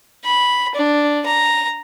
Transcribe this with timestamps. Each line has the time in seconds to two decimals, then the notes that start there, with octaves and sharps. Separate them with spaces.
0.24 B5
0.75 D4
1.26 A#5